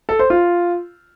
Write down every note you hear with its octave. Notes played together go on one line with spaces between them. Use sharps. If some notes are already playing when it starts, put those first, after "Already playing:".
A4
C5
F4